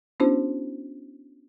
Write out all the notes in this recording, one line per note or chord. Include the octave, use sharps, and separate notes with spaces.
B3 C#4 D4 E4 F#4 C5